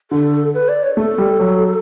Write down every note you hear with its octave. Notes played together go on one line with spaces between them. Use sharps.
D3 A4
B4
D5
C#5
A3 A4
G3
F#3